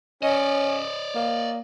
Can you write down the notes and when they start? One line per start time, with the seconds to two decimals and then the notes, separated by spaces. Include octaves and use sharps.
0.23 C#4 D5 D#5
1.16 A#3